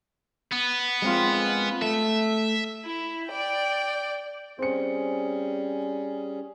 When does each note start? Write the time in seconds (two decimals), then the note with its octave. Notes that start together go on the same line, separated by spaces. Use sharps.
0.52 B3
1.02 G#3 C4 F4
1.82 A3 E5
2.85 E4
3.28 D5 G5
4.59 G3 C4 C#4 G#4 C#7